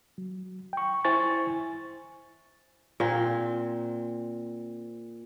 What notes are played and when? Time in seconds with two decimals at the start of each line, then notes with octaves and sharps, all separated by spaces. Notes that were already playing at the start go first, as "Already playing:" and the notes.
0.18 F#3
0.73 G5 C#6
1.05 E4 C5 G#5 C#6 A6
3.00 A#2 C4